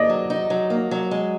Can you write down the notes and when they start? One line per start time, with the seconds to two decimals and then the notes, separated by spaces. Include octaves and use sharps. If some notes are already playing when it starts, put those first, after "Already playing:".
Already playing: A#3 D5 D#5
0.10 F#3
0.30 D#4
0.50 F#3
0.70 A#3
0.91 F#3
1.11 G#3